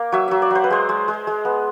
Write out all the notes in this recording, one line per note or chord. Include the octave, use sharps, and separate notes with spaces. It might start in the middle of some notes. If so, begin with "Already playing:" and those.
Already playing: A#3
F#3 E5
F#3 E5
D5
F#3 C5
B4
G#3 C5
G#3
G#3
G#3
B3